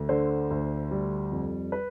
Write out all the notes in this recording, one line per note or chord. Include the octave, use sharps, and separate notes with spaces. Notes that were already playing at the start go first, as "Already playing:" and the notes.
Already playing: D2
D3 C5
D2
G3
F2
B4